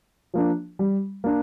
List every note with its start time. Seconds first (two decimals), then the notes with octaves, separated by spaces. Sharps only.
0.34 F3 A#3 D4
0.79 G3
1.24 A#3 D4